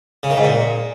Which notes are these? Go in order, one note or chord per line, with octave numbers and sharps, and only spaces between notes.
C#3
D#3
G#2
A#2